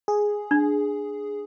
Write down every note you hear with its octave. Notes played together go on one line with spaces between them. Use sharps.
G#4
D4